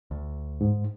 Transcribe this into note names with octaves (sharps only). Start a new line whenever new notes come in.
D2
G#2